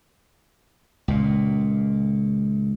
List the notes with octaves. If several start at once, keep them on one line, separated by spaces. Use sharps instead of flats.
C#2 A#2